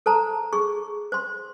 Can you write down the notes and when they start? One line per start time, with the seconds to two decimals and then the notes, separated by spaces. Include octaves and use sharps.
0.06 A4 C5 A5 A#5
0.53 G#4 C#6
1.12 C5 C6